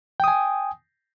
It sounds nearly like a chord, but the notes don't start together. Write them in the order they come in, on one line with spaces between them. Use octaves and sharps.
G5 D#6 G#5